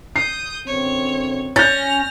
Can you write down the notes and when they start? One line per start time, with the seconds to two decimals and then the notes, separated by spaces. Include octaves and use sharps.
0.16 D#6 G6 C7
0.67 F#2 D3 C4 C#5
1.56 C#4 F6 G6 A6 A#6